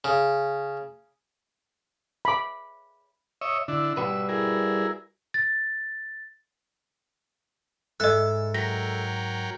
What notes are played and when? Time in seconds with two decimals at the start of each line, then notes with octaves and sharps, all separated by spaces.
0.04 C#3
2.25 B5 D6
3.41 C#5 D#5 E5
3.68 D3 D4 E4
3.97 G3 F#4 B4 E6
4.29 E4 G#4 A#4
5.34 A6
8.00 G#2 G#3 A4 D#5 E5 F#6
8.54 F#3 A#4 G5 A#6 B6